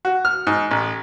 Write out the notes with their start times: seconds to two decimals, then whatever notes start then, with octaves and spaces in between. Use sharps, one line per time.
0.05 F#4
0.25 F6
0.47 G#2
0.71 A1